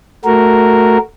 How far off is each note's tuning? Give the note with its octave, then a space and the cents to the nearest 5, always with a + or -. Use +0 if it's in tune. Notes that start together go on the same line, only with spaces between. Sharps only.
A3 +0 F#4 +0 A#4 -5